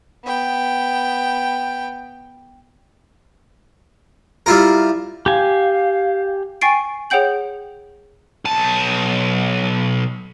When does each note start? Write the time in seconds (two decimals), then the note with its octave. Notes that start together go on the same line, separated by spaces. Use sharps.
0.25 B3 G5
4.46 G3 E4 F4 A#4
5.26 G4 F5 G#5
6.61 G5 G#5 C#6 A6 C7 D7
7.10 G#4 C#5 F#5 G5 G6 F#7
8.45 B1 A5